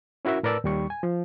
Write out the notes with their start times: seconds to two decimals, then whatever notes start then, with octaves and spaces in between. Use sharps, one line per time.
0.25 C#4 E4 F#4 A#4 E5
0.43 A2 A#4 B4 D5 A5 E6
0.64 D#2 G3 C#6
0.90 G#5
1.03 F3